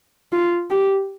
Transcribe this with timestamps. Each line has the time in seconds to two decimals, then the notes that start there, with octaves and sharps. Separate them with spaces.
0.32 F4
0.70 G4